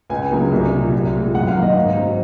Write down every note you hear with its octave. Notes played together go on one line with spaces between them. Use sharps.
C#2 G#5
C#3 F#3 A#3
C2
A#2 F#3
C2
A#2 G#3
F#2 F#5
F5
D#3 A#3
D#5
G#2
F#3 C4